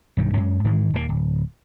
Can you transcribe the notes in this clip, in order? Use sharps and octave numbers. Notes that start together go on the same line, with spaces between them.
B1 G2 D#3
F#2 G#3 C#4
G#2 D#3 E3 G#3
D#1 D#2 A#2 A#3
D1